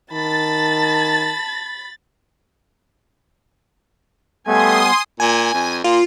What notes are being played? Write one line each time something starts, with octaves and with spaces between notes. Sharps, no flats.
D#3 A5 B5 A6
G3 A3 B3 G#5 C6 D#6
A#2 G#5
F2
A#2 F4